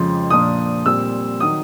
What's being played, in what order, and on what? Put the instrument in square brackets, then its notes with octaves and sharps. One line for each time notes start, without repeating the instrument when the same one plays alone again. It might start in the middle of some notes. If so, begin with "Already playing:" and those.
Already playing: [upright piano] F2 C#3 F3 G#3
A#2 F3 A#3 D4 D#6
A#2 G3 C4 E6
D#3 F#3 D#6